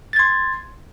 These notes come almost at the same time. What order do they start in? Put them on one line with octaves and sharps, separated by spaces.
A6 G#6 C6